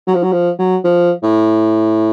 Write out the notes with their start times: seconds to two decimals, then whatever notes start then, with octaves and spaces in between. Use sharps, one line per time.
0.07 F#3
0.14 F3
0.23 F#3
0.32 F3
0.59 F#3
0.84 F3
1.23 A2